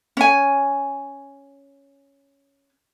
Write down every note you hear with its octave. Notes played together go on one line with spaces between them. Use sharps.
C#4 G#5